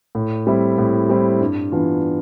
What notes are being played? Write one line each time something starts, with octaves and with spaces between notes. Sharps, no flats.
A2
G3 C4 E4
A2
G3 C4 E4
G2
E3 B3 D4 F4